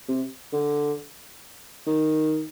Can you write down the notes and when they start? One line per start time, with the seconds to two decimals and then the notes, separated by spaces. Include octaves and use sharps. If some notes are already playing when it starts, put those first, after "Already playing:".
0.08 C3
0.53 D3
1.87 D#3